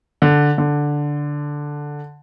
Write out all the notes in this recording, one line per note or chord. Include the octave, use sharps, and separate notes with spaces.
D3
D3